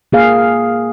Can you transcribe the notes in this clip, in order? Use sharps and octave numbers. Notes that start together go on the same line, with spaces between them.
A#3 G#4 F5